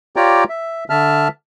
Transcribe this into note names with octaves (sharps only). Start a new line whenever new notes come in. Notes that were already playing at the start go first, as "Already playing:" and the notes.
F4 G4 C#5 D5 G5 A#5
E5
D3 E5 A5 F6